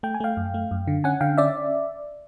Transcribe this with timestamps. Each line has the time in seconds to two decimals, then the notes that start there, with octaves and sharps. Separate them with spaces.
0.03 A3 G5
0.14 G#5
0.20 A3 F5 G5
0.37 F#2
0.54 A3
0.71 F#2
0.87 D3
1.04 C#4 F#5 G#5
1.21 D3 F5 G5
1.38 C#4 D5 E5